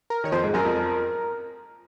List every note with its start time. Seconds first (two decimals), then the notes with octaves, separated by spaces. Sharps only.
0.10 A#4
0.24 D#3 C#5
0.32 F2 F3 C5
0.43 G#2 G#3
0.54 F#2 F#3 A#4
0.65 F2 F3